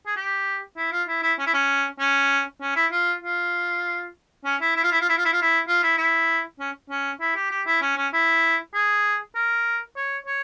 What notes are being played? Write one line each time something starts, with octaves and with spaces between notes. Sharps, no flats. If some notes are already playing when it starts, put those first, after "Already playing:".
G#4
G4
E4
F4
E4
E4
C#4
E4
C#4
C#4
C#4
E4
F4
F4
C#4
E4
E4
F4
E4
F4
E4
F4
E4
F4
E4
F4
E4
E4
C#4
C#4
E4
G4
G4
E4
C#4
C#4
E4
G#4
A#4
C#5
C#5